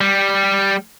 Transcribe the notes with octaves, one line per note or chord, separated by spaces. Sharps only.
G3